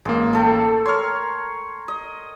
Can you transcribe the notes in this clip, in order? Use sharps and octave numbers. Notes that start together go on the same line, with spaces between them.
A1 G#3 A#3
A3 A4 G5
A#4 C#5 C6 F6
D#5